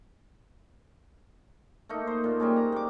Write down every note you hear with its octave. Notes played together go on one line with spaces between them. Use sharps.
A3 A#3 D#4
C5
A#2 A#3
G3 G#3 C#4
A#5
A#3 D6